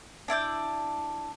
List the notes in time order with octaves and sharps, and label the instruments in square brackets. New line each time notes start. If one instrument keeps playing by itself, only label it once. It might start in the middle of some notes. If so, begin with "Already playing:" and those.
[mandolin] D4 E4 D5 G6